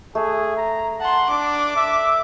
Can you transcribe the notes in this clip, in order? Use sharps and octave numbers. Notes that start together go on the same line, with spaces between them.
A3 G#4
A#5
F#5 A5 C6
D4 D6
E5